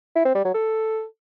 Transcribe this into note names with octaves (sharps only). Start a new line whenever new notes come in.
E4
C4
G3
F#3
A4